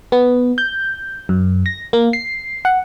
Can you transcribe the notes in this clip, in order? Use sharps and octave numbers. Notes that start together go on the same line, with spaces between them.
B3
G6
F#2
A#6
A#3
C7
F#5